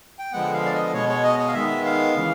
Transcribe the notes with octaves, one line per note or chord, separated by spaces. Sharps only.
G5
D3 F3 G#3 B3 F#5
F5
D5
D#5
B2 G#3 B3 C#5
C#5
D#5
D#5
F5
D#3 G#3 B3 E5
F5
C#3 E3